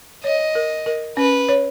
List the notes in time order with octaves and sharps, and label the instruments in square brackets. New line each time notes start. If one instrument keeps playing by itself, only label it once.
[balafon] C#5 [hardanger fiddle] D#5
[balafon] A#4
A#4
[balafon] C#4 [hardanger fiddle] B4
[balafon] C#5